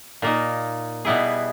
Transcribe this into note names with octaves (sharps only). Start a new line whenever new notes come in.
A#2 A#3 D#4
B2 G3 B3 E4 G#4